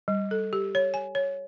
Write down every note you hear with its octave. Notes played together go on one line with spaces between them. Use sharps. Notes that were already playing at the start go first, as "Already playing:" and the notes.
G3
A4
G4
C#5
G#5
C#5